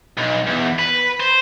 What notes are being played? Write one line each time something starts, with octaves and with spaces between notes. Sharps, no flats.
B1
E2
B4
C5